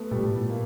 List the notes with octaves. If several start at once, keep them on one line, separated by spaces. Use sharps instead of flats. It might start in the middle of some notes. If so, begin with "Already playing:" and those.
Already playing: A3 B3
A#2 G3 A3
A2
A#2
A#3